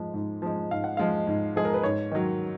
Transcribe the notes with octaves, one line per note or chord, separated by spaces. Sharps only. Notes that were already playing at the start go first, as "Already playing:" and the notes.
Already playing: G#2 F3 G#3
G#2
F3 G#3
G#2 F5
F#5
F3 G#3 F5
G#2
F3 G#3 G#4
A#4
B4
G#2 C#5
D#3 F#3